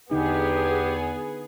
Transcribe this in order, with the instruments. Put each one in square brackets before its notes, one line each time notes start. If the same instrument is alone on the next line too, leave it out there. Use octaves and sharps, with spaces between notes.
[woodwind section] E2 [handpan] D3 D#4 [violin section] B3 G#4 [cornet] G4